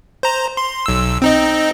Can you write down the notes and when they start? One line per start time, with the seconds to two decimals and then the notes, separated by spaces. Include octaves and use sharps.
0.23 C5 A#5
0.57 C6
0.86 B1 E6
1.22 C4 D#4 D#5